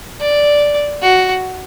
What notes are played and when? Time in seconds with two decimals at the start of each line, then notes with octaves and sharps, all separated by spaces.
0.20 D5
1.02 F#4